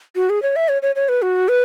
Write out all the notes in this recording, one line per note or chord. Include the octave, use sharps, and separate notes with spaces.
F#4
G#4
C#5
E5
C#5
C#5
C#5
B4
F#4
B4